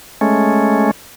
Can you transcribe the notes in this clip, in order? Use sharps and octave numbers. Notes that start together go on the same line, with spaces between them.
G#3 A3 C#4